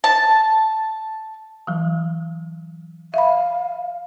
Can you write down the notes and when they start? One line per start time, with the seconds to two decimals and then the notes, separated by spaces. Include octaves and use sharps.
0.04 A5
1.67 E3 F#3
3.14 E5 F5 B5